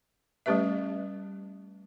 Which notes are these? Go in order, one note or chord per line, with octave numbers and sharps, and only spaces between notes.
G3 A3 C#4 G4 B4 E5